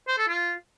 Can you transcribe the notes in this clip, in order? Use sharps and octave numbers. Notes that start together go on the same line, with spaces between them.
C5
A4
F4